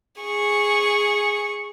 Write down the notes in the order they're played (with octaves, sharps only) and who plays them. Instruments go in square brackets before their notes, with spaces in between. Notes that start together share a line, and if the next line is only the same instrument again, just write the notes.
[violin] G#4 C#6